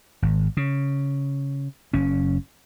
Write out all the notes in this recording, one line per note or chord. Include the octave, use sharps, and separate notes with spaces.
G#1
C#3
F#1 C#4